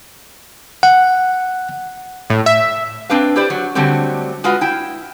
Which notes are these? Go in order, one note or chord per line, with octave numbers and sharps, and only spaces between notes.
F#5
A2
E5
C4 D4 B4 F5
E4 G4 B4 C5 D5
F#3
D3 F#3 G3 A3 C4
G#3 F4 F#4 B4
E4 G5